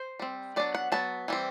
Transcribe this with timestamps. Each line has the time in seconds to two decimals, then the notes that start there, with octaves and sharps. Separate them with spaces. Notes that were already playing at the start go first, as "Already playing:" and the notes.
Already playing: C5
0.19 G3 C4
0.56 F#3 B3 D4 D5
0.75 F#5
0.92 F#3 B3 A5
1.28 E3 G3 C4